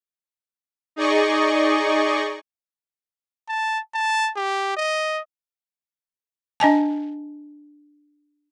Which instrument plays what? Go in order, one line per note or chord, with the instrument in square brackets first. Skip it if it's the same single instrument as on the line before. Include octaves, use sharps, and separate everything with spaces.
[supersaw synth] D#4 G#4 D5 D#5 C#6
[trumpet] A5
A5
G4
D#5
[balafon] D4 D#5 G#5 A5